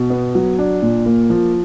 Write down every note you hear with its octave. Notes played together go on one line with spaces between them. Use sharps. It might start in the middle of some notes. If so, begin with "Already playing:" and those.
Already playing: B2
B3
F#3
D4
A#2
A#3
F3